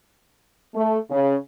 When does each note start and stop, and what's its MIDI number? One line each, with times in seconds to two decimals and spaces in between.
0.75 0.98 57
1.10 1.34 49